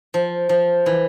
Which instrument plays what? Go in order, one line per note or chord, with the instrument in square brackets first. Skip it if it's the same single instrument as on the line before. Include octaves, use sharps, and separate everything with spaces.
[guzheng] F3
F3
E3